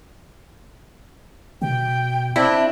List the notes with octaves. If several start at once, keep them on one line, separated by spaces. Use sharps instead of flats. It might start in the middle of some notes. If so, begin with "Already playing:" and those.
B2 G5
C4 D4 E4